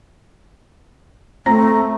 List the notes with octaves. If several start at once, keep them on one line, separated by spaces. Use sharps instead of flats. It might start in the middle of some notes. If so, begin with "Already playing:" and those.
A3 C4 A#5 A#6